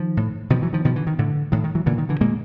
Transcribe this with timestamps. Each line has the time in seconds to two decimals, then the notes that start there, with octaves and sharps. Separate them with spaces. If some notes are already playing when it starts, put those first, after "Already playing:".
Already playing: D#3 F3
0.17 A2
0.50 B2 D#3 F3
0.62 E3 F#3
0.73 D#3 F3
0.85 B2 D#3 F3
0.96 D3 E3
1.07 D#3
1.19 A2 D3
1.52 A2 D#3
1.64 D#3
1.75 E3 F#3
1.86 A#2 D3 E3
1.98 D#3
2.09 D3 E3
2.21 A#2 G#3 A#3